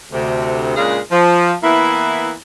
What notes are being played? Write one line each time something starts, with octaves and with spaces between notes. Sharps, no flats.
D2 C3
A#2 C#3 G#3 D4 G#4 F5
F3
E3 A#3 B3 E4